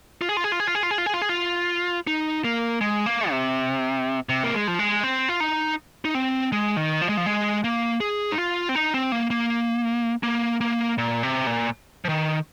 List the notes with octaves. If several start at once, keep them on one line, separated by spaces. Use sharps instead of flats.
F4
G#4
F4
G#4
F4
G#4
F4
G#4
F4
G#4
F4
G#4
F4
G#4
F4
D#4
A#3
G#3
A#3
C3
C3
A#3
G#3
F3
G#3
C4
F4
D#4
D#4
C4
G#3
D#3
F3
G#3
F3
G#3
A#3
G#4
D#4
F4
C4
D#4
C4
A#3
A#3
A#3
A#3
A#2
C3
A#2
F3
D#3